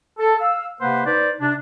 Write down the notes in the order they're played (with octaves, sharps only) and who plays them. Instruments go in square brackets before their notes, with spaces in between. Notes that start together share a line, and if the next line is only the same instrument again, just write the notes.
[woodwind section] A4
F5 E6
C3 A#3 B4 C5 F#5
D#4 B4 C5 D5
C3 D4